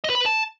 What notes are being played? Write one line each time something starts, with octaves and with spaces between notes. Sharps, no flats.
D#5
B4
B5
B4
A5